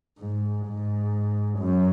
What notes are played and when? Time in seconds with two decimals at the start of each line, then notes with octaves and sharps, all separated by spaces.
0.19 G#2
0.66 G#2
1.59 F#2